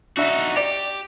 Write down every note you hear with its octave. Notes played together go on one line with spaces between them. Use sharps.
D4 D#4 F#4 E5
G4 D5